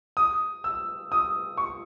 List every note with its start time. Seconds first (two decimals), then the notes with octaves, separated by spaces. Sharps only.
0.17 D#6
0.64 E6
1.12 D#6
1.57 C#6